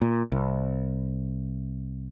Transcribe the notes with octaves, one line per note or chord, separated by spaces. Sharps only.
A#2
C2